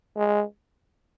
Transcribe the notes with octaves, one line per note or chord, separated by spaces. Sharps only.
G#3